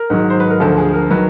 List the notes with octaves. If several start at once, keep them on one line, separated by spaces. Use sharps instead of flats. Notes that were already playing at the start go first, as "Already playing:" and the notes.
Already playing: A#4
G#2 D#3 F#3
C5
B4
A#4
D2 D3 F3 A4
G#4
A#4
D#3 F#3 B4